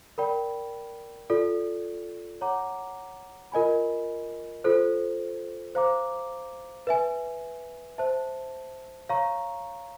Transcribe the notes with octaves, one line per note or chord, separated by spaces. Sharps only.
A#4 D5 G5 B5
F4 A4 D5
C#5 F#5 A#5 D6
F4 A#4 D#5 G#5 B5
F4 A4 C5
C5 F5 A#5 D6
B4 E5 G#5
C5 E5 A5
C#5 F5 A#5 C#6